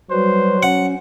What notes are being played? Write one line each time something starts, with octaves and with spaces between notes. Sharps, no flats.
F#3 G3 F#4 B4 C5
C#4 F#5